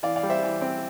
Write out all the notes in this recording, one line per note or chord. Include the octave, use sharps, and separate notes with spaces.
E3 D5 F5
D5 F5
G3
C5 E5
E3
C4